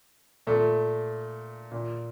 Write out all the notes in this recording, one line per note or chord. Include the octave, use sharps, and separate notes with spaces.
A#2 A3
A#2